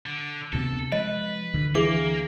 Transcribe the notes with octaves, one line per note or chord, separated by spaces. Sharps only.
D3
D2 C3 B3 A4
F3 G#3 B4 D#5
D2 D3
E3 A#3 G#4 D6